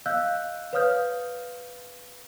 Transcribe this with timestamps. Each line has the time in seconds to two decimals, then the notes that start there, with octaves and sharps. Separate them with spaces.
0.06 D#5 F5 E6 F#6 G6
0.73 B4 C#5 F5 D#6 F6 G6